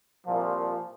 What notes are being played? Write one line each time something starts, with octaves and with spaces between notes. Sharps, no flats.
C2 A#2 F3